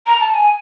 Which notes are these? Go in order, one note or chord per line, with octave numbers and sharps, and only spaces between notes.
A#5
A5
G#5